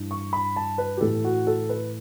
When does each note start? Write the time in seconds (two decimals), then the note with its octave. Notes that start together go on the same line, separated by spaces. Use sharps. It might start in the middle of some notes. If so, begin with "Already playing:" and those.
Already playing: G2 E3
0.11 C#6
0.33 B5
0.56 A5
0.78 B4
0.97 G4
1.01 A2 E3 A4
1.24 F#4
1.47 A4
1.69 B4